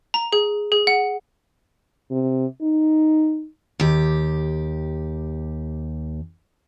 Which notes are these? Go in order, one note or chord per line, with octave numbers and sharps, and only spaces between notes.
A#5
G#4
G#4
F#5
C3
D#4
D#2 G4